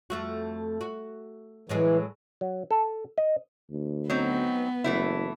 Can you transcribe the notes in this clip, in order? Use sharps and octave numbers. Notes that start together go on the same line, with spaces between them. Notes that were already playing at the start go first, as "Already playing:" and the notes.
F2 A3 F#4
F#4
A2 E3 F#3 G#3
F#3
A4
D#5
D2
F#3 B3 C4 D#4
F#1 E3 A3 E4